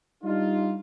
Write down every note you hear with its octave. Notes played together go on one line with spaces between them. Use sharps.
G3 D4 D#4 F4